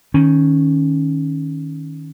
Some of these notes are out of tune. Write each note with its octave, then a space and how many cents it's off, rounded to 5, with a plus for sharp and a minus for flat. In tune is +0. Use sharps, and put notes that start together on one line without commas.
D#3 +0 C#4 +0